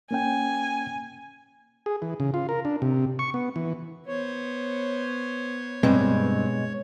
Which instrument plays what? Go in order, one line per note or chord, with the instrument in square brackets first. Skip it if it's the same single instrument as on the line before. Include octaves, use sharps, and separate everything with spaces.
[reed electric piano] A#3 C#4 G5 [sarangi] G#5
[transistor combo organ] G#4
E3
C#3
F4
A#4
D4
C3
C#6
B3
E3
[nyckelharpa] B3 C5 [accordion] C#5
[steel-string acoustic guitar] G2 C4 [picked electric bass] B2 G#3